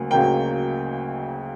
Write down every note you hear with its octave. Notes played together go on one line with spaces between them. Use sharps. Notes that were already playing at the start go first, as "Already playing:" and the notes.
Already playing: D2 C#3 F#3 A#3
D2 C#3 F#3 A#3 G5